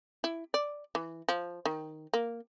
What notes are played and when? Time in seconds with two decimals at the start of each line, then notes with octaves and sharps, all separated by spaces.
0.24 E4
0.54 D5
0.95 E3
1.29 F3
1.66 D#3
2.14 A#3